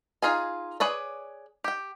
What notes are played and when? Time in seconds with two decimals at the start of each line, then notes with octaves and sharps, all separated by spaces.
0.22 D#4 F4 G#4 G#5
0.80 G#4 B4 C#5 D5
1.64 G4 G5